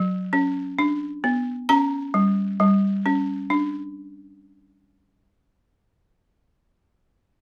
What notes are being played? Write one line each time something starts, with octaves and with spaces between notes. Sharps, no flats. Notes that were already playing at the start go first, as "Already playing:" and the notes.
Already playing: F#3
C#4
D4
B3
C#4 A#5
G3
G3
C#4
D4